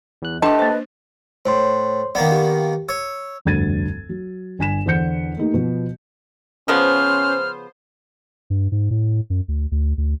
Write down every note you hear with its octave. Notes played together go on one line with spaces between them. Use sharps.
E2 F#6
A3 D4 G4 A4 B4 D#5 A5 D6
A#3 C5
A2 C5 C#5 C6
D#3 A#3 B3 D5 F5
G4
C#5 E6
F1 D2 G2 G#6 A6 D#7
F#3
G1 G#5 B6 E7
E2 D3 C5 F#5 G6 C#7
A3 A#3 D#4 G4
B2 F3 B3 F#4
C#3 F3 B3 C#4 C5 F6
G2
G#2
A2
F#2
D2
D2
D2